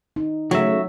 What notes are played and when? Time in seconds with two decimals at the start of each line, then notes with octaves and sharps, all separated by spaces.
0.16 D#4
0.51 C#3 F#3 A3 F#4 E5